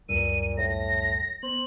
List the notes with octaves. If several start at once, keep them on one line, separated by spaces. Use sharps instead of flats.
C#2 F#2 A#2 G3 D#7
A2 A#6
B3 C5 F#7